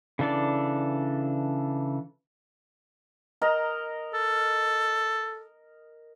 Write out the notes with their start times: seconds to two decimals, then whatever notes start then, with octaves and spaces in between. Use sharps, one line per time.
0.19 C#3 E3 D4 A4 D5
3.42 A#4 D#5 A#5
4.14 A4